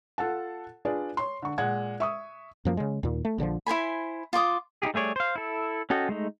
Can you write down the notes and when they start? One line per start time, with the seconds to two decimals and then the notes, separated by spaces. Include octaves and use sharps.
0.18 F4 A4 F#5 A5
0.85 D4 F4 G#4 B4 D5
1.17 C#5 C6
1.42 D3 C#6
1.58 A#2 G#3 F#5 G#6
2.00 E5 C#6 D#6
2.65 F#2 F3 A#3
2.77 C#3 G#3
3.03 D#2 A#2
3.25 A3
3.38 A#1 D3 D#3 F3
3.67 E4 C5 G#5 B5
4.33 F4 C6 D6 D#6
4.82 D#4 E4 G4 G#4
4.94 G3 A3 G#4 C#5 D5
5.16 C5 F5
5.36 E4 A4
5.90 C#4 F#4 A4 D#5 G5
6.09 G#3 A3 D#4